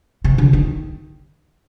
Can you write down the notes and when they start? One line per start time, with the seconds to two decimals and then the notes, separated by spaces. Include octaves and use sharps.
0.24 C3
0.38 D3
0.53 D#3